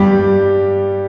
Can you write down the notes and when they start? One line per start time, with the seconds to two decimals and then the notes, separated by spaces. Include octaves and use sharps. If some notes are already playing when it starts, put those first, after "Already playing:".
Already playing: G2 G3 G4